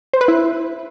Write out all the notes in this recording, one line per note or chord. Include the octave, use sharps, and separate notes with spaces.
C5
B4
E4